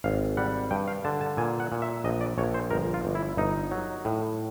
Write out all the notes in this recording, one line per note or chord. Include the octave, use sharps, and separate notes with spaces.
G#1 F5
G3 F#5
G2 G5
F5
D3 A5
A5
A#2 G#5
F#5
A#2
E5
A#1 D#5
D5
A#1 C#5
C5
G1 A#4
F4
G1
E4
G1 D#4
F#3
A2